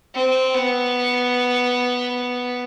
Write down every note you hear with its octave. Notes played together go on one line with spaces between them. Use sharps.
C4
B3